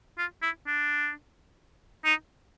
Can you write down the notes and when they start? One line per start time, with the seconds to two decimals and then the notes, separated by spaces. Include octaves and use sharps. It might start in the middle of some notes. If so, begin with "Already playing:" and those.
0.18 F4
0.42 E4
0.67 D4
2.05 D#4